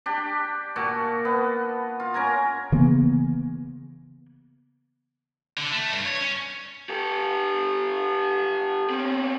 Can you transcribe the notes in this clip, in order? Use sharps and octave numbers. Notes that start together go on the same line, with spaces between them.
D4 G4
A#2 F#4 A5
B3
F4
C#4 A#4 G#5 A#5
C#3 E3 A#3 B3
D3
A3
G2
C#5
C#4
G4 A4
C4 C#4